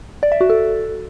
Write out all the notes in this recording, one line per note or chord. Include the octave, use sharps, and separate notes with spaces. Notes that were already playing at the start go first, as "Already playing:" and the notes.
D5
E5
F#4
A4